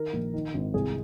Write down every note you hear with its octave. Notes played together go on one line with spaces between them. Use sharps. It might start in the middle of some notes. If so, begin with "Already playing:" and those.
Already playing: D#3 A#4
A#1
D#3
G#1
C2 G#4